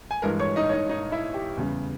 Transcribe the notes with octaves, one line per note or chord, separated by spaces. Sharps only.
G#5
G2 E3 G#3 A#4 A#5
C#5 C#6
D#4 D#5
C#5
D#4 D#5
D#4 D#5
E4 E5
G4
E2 C#3 G3